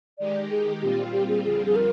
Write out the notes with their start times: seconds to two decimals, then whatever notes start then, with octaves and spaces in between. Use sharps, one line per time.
0.18 D#3 G#3 D#4 G4 D5
0.50 G#4
0.81 A#2 G3 C4 F4 G4
1.12 G4
1.29 G#4
1.43 F2 D3 G3 C4 F4 G#4
1.66 G#4
1.76 A#4